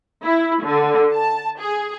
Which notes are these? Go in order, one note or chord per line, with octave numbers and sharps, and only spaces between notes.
E4
D3
A5
G#4